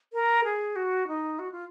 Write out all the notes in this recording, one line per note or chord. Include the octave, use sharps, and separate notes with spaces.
A#4
G#4
F#4
D#4
F#4
F4